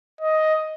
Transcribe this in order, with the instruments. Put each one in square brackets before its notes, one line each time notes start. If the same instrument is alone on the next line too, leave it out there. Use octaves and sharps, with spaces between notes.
[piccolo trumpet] D#5